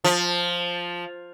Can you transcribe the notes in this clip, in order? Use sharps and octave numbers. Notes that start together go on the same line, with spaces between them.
F3